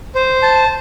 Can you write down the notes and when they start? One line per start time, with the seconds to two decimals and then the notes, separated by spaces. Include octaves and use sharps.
0.15 C5
0.43 A5